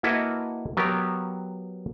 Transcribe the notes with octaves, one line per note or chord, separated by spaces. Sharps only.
A#3 E4 F#4 A4 B4 D#5
F#3 B3 G4 A#4